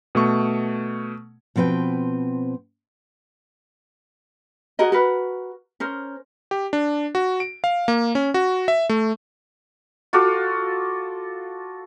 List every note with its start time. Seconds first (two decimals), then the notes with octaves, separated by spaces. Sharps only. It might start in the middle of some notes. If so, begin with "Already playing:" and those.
0.15 B2 A3 C#6
1.56 B2 F3 C4 B4 G5
4.79 F#4 G#4 A#4 D#5
4.92 F#4 A#4 B4
5.80 C#4 A#4 C5
6.51 G4
6.73 D4
7.15 F#4
7.40 D7
7.64 F5
7.88 A#3
8.15 C#4
8.34 F#4
8.68 E5
8.89 A3
10.13 F4 F#4 A4 D6